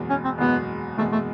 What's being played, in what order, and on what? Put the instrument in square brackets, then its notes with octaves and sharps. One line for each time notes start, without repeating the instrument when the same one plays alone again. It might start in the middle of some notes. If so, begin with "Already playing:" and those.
Already playing: [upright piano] F#1 E2 B2 G#3
[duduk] C#4
C4
[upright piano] F#1 E2 B2 G#3 [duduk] B3
[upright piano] F#1 E2 B2 G#3 [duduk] A3
[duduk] A3